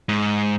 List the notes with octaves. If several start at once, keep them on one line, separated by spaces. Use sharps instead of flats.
G#2